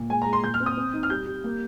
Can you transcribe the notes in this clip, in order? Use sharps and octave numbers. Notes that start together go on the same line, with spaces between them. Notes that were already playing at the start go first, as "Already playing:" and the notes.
Already playing: A#2
G#3 G#5
G#3 A#5
C6
A#2 G6
F6
C4
D#6
C4
D#4
F6
G3 G6
G3
A#3